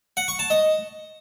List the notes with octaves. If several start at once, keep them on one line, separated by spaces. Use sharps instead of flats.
F#5
C#6
A5
D#5